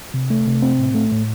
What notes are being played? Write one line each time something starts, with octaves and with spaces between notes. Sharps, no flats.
C3
A3
C3
C4
A2
A3
A2